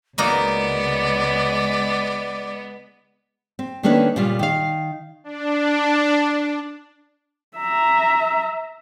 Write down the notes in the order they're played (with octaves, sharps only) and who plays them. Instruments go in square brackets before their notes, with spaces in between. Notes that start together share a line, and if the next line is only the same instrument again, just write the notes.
[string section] C#2 [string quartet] G#3 B3 [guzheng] A#3 D#4 F#4 [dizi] D5
[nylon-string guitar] C4
D#3 A3 A#3 C#4 D4 B4
A#2 C#3 G3 F4
D#3 F5
[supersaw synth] D4
[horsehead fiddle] E5 A#5